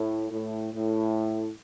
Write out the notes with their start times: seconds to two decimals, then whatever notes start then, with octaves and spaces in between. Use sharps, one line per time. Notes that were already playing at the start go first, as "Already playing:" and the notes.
Already playing: A2
0.31 A2
0.73 A2